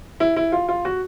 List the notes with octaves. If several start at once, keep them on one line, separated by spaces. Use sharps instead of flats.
E4
E4
F4
F4
F#4